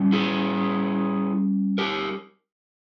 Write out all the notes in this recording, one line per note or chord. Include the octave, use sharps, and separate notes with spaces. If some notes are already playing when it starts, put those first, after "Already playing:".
Already playing: G3 C#4
E4 G#4
G4 A#4